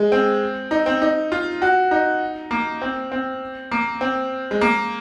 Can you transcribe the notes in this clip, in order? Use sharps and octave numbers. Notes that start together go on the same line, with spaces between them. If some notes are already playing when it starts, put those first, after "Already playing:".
Already playing: G#3
C4
D#4
C4
D#4
F4
F#4
D#4
A#3
C4
C4
A#3
C4
G#3
A#3